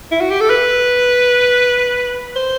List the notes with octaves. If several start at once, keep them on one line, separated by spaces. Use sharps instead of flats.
E4
F#4
G4
A4
B4
C5